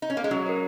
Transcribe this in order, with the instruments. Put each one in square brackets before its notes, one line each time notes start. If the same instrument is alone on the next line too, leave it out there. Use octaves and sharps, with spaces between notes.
[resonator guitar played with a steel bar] D#4
C#4
A#3
G#3
[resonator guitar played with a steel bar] F#3 [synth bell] C#4
[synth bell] A#4 C#5